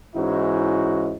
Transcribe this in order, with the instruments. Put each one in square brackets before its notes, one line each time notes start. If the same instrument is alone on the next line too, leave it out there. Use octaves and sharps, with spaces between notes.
[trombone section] G#2 E3 C#4 D#4 E4 F#4